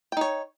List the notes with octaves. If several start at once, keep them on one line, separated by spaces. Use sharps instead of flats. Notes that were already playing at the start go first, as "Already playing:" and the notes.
D#4 C#5 G5